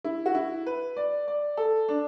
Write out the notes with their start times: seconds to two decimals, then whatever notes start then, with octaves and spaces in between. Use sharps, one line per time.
0.04 E4
0.26 F#4
0.35 E4
0.66 B4
0.96 D5
1.28 D5
1.57 A4
1.88 D4